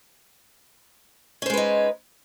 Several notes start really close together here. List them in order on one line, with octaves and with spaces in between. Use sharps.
C#4 C5 G#3 B4 D#4